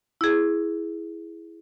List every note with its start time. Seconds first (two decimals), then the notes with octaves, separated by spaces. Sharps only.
0.21 E4 G#4